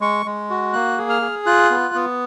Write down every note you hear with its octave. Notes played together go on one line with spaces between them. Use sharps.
G#3 C#6
G#3
F#4
A#3 F#6
G#4
F6
G#4
F4 F#6
B3
B3